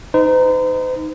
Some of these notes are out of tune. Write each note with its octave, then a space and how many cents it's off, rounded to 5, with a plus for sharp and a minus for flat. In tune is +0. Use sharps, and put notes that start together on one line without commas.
D#4 +0 C5 -45